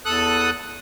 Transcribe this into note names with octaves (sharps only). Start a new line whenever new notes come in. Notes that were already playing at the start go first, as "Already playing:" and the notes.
E2 A4 D#6 F#6